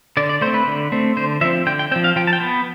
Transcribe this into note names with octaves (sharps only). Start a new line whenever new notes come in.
D3 D5
D5
A3 C4 C5
B4
D3
A3 C4
D3 C5
F3 C4 E5
D3 G5
G5
F3 C4 G5
F5
F3 G5
A5
G5
B3